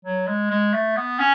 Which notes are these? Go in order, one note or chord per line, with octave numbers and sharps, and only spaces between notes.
F#3
G#3
G#3
A3
B3
C#4